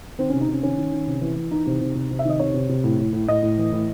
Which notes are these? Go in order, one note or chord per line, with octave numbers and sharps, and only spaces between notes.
D#3 C4
C#4
C3
D#4
C3 C#4
D#3 C#4
D#3
D#3
C3
E3
E3
E3 D#4
C3
C3
C3
C3
E5
D#3 D#5
C3 C#5
C3
C3
A2
A2
A2
A2 D#5
A2
E3
A2